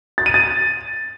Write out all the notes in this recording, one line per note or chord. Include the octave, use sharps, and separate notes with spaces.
A6
D#7
A6